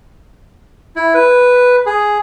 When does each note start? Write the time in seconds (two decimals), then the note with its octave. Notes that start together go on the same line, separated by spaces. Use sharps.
0.96 E4
1.14 B4
1.86 G#4